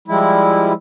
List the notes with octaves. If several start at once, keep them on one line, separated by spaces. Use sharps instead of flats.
F3 G3 G#3 E4